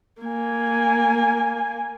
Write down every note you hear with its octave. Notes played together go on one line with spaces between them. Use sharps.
A#3 G#5